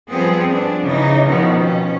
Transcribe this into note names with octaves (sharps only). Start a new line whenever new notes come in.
F3 G3 B3 C4 G#4
D4
C#3 E3 D#4
B2 D#3 F3 B3
C#4